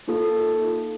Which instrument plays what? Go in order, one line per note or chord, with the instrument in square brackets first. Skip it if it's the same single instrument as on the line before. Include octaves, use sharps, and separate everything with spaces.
[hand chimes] A#3 D#4 F4 A4